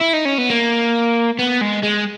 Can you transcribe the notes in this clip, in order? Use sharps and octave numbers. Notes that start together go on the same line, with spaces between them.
E4
D#4
C#4
B3
A#3
B3
G#3
G#3